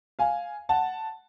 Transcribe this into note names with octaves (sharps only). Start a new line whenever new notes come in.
F5 G#5
F#5 A5